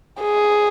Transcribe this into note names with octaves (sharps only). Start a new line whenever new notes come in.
G#4